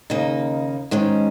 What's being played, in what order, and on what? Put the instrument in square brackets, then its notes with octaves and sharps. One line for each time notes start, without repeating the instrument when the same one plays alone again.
[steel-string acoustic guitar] D#2 C#3 A#3 D#4
G#2 D#3 G#3 C#4